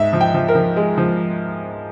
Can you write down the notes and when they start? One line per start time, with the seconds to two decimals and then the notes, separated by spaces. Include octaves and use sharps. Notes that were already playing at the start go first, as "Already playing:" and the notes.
Already playing: G#2 E5
0.13 F3
0.21 G5
0.34 F3
0.48 A#4
0.55 F3
0.76 G#3
0.98 F3